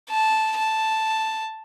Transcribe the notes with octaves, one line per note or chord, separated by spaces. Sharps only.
A5
A5